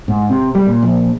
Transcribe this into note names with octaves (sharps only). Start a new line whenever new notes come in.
G#2
C3
G3
A#2
A#1